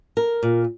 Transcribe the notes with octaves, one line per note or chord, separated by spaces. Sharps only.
A#4
A#2